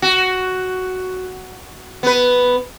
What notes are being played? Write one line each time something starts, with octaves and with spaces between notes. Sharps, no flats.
F#4
B3 B4